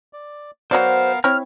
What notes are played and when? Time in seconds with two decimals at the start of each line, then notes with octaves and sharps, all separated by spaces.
0.13 D5
0.71 F#3 B3 F#4 A#4 C5 D5 F5
1.24 C4 E4 C#5 F6